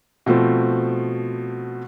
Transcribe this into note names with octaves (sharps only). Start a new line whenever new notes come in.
B2 F3 A3 C4